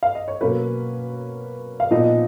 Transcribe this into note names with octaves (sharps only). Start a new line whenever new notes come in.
F5
D#5
C#5
B2 F#3 A#3 C#4 B4
F5
A#2 F3 B3 D#4 D#5